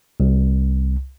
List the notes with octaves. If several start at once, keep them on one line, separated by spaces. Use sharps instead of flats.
C2